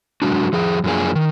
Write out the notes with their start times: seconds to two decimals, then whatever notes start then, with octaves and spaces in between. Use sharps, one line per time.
0.22 F#2 D#3 G#3 D4 F#4
0.53 F2 F3 G#4
0.84 F#2 F3 A#3 D4 G#4
1.15 D#3